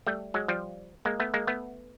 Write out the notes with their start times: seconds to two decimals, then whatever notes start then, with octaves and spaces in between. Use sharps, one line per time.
0.07 G3 A3
0.34 F#3 G#3
0.48 F3 G3
1.05 G#3 A#3
1.20 A3 B3
1.34 G#3 A#3
1.47 A3 B3